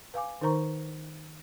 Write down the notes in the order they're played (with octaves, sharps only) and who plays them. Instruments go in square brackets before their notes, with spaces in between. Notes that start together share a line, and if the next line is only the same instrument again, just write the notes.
[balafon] B4 F5 G#5 D6
D#3 D#4 A#4 C5 A#5 C#6